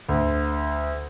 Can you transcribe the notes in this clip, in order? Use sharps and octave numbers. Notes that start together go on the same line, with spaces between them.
D2